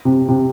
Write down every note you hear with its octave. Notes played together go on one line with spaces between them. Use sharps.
C3
C3